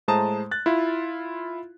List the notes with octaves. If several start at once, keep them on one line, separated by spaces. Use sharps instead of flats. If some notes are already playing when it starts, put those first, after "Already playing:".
A2 G#3 C5 A5 A#5 D#6
F#6 A6
E4 F4